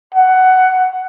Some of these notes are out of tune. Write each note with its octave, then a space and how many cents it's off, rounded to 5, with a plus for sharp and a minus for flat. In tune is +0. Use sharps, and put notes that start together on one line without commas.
F#5 +10